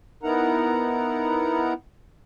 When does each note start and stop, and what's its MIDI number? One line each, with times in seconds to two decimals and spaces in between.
0.23 1.73 59
0.23 1.73 63
0.23 1.73 64
0.23 1.73 70
0.23 1.73 78
0.23 1.73 82